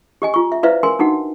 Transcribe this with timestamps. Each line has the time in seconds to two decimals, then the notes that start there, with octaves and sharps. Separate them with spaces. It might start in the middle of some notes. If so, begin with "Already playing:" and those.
0.22 G4 D#5 G#5
0.34 F4 C#6
0.52 E5
0.63 E4 B4 C5 D5 E5 F5
0.83 A#4 G#5 C6
0.99 D4 D#4 F#4 F#5